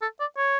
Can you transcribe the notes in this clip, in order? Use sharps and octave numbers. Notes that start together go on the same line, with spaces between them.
A4
D5
C#5